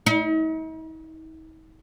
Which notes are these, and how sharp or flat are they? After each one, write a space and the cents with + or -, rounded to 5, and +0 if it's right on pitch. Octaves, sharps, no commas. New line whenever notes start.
D#4 +45